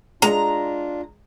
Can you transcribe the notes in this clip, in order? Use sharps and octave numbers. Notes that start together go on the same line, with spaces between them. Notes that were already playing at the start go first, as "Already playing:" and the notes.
G#3 D4 F4 A#5